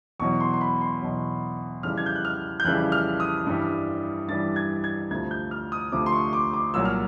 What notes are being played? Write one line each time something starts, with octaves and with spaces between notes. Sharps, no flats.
E2 B2 F#3 C#6
C6
C6
B5
C6
E2 B2 F#3
F2 C#3 E3 G3 F6
G#6
G6
F#6
F6
G6
F2 C#3 E3 G3 F#6
F6
D#6
G2 E3 G3
G2 E3 G3 A6
G#6
G#6
D2 C3 F3 G#6
G6
F6
D#6
D2 C3 F3 D6
C6
C#6
D6
D6
C2 A#2 F#3 E6
F6